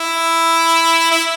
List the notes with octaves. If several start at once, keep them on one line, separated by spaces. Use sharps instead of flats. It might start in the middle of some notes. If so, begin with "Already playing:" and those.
Already playing: E4
E4